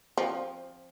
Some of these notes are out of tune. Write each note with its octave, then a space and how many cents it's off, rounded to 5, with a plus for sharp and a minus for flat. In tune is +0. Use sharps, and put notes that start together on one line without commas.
F3 +0 C4 +20